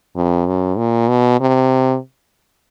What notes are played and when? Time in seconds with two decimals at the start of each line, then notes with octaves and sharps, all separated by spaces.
0.16 F2
0.47 F#2
0.77 A#2
1.09 B2
1.40 C3